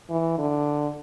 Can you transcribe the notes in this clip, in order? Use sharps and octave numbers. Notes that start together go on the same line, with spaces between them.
E3
D3